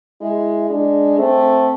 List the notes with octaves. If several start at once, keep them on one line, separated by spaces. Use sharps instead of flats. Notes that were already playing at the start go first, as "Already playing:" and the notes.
G#3 E4
G#3 D4
A3 C4